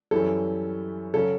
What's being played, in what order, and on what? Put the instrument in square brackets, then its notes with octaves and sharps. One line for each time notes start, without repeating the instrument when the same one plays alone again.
[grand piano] F#2 E3 G3 C#4 [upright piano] A4
[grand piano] C#3 F#3 C#4 [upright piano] A4